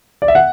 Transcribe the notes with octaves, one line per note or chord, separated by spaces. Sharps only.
D5
E5
F#5